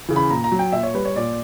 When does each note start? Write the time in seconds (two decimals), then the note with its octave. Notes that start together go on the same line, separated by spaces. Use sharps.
0.08 C#3 E3
0.16 B5
0.30 A#2 A#5
0.44 A#5
0.52 F#3
0.59 G5
0.72 A#2 E5
0.83 C#5
0.94 G3 B4
1.05 C#5
1.16 A#2 D5